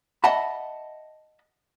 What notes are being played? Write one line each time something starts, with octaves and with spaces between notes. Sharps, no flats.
D#5 E5 F#5 A5 B5